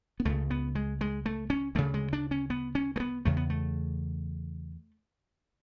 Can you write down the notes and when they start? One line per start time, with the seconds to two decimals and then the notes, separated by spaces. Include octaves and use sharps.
0.20 B3
0.25 C#2 C#3 A3
0.50 B3
0.75 G#3
1.01 G#3
1.26 A3
1.50 C#4
1.75 D2 C#3 A3
1.94 G#3
2.13 D4
2.31 C#4
2.50 B3
2.75 C#4
2.96 A3
3.00 B3
3.25 E2 C#3 A3
3.37 B3
3.50 A3